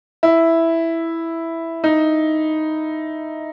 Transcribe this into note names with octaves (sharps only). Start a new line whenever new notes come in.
E4
D#4